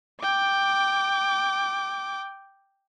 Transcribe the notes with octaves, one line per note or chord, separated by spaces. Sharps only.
G5 D6